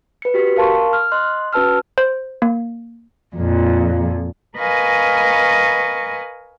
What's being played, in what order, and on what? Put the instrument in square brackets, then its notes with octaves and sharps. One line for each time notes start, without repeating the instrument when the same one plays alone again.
[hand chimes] B4 C#7
F#4 G4 B6 C#7
A#4 F5 A5 C6 C#6
F6
D#5 C6 F#6
C#4 F#4 B4 A5 E6 F6
[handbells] C5
A#3
[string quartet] F2 A#2
A#4 B4 D#5 F5 G#5 C#6